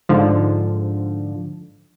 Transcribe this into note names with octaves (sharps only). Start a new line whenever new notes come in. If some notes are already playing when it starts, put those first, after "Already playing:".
G#2 D3 F3